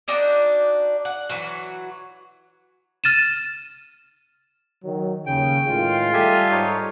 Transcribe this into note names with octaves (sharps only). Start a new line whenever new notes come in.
D4 D#4 F#4 D5
F#5
E3 F#3 F#4
F6 A6 D#7 E7
D#3 F#3
D#2 C#3 G5
A2 D#3 G#3 F4
G3 G4 A4 E5 G#5
G#2 D#4 C#5